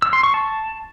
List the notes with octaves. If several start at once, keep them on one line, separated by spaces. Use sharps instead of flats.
E6
C6
C#6
A5